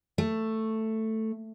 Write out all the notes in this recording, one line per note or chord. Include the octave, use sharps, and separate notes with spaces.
A3